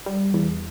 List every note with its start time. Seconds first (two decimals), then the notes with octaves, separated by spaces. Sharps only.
0.06 G3
0.34 E2